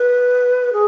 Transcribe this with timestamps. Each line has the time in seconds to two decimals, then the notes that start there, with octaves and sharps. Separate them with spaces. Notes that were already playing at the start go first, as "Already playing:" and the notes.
Already playing: B4
0.73 G#4